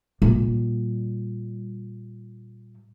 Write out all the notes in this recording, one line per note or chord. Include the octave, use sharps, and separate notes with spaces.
A#2 G3